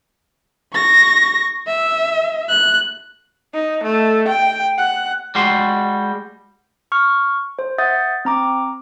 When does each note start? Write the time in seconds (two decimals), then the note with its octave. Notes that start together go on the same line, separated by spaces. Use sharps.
0.74 C#6 A#6
1.67 E5
2.49 F#6
3.53 D#4
3.84 A3
4.28 G5
4.78 F#5
5.35 G3 G#3 F#4 C6
6.92 C#6 F6
7.59 C5
7.78 E5 F#5 D#6 G6 A6
8.25 C4 A#5 D6